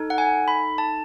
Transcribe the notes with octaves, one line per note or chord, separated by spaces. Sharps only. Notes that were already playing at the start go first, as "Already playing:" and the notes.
Already playing: D#4 A4
F#5
G#5
B5
A5